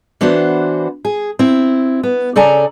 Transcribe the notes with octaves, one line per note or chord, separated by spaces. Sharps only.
E3 B3 D4 F#4 C5
G#4
C4 E4
B3
C#3 A4 D5 G#5 A#5